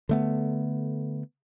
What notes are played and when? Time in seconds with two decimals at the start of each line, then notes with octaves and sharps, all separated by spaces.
0.09 D3 A3 B3